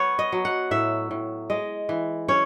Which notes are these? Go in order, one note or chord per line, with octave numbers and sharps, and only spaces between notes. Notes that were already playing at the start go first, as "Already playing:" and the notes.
Already playing: B3 C#5
D#5
F#3
F#5
A2 E5
A2
G#3 D#5
E3
C#4 C#5